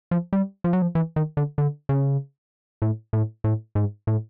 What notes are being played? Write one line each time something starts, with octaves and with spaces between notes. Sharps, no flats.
F3
G3
F3
F#3
F3
E3
D#3
D3
D3
C#3
A2
A2
A2
G#2
A2